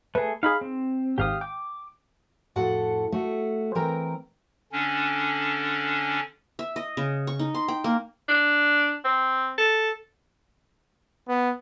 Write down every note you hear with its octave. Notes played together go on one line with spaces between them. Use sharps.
A3 G#4 B4
D#4 G#4 F5 B5
C4
G#1 G#2 G4 F5 D#6
G5 D6
F2 A2 F#4 A4 F#5
A3 F#4
E3 C4 A#4 G5 A#5
D3 C#4 D4
E5
D#5
C#3
C#6
D#4
C6
G5
A#3
D4
C4
A4
B3